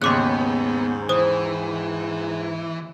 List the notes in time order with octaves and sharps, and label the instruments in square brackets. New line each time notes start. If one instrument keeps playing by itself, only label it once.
[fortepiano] D#2 C#3 [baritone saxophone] G#2 [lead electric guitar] B3 [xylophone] C6 D6 F#6
[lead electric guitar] E3 [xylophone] C5 D#6